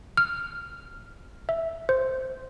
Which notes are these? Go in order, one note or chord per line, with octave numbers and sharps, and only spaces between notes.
F6
E5
C5